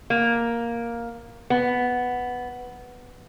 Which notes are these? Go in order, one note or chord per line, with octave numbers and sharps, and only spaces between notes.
A#3
B3